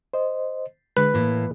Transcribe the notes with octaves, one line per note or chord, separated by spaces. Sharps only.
C5 D#5
D3 G#3 B4
A2 E3 A#3